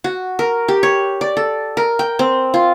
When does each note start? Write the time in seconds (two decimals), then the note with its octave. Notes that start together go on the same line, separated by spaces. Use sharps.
0.04 F#4
0.39 A#4
0.68 G4
0.83 C#5
1.21 D5
1.37 A4
1.77 A#4
1.99 G5
2.19 C4
2.54 F4